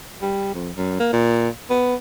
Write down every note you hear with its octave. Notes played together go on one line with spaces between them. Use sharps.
G3
F2
F#2
A#3
A#2
B3